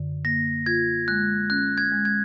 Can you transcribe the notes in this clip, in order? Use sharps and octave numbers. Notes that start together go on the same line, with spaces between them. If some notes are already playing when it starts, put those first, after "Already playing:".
Already playing: F#2 D3
A#3 A#6
F4 G#6
G#3 F#6
C#4 F#6
G#6
G#3
G#6